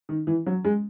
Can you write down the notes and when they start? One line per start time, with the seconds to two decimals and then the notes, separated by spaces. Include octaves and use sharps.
0.09 D#3
0.27 E3
0.46 F#3
0.65 G#3